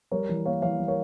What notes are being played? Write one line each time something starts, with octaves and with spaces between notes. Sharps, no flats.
G3 A#4 C#5
E3
A#3 C#5 F5
E3 C#5 F5
G3
A#4 C#5